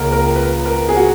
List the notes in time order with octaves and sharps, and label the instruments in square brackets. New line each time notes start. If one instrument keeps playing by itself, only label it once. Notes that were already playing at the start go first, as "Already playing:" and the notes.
Already playing: [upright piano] C#2 A#3 [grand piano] A#4
[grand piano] A#4
B4
A#4
G#4
F#4